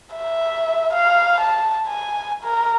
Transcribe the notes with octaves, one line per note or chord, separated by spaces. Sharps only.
E5
F5
A5
G#5
A#4